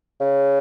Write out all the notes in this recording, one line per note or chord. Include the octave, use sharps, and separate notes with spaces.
C#3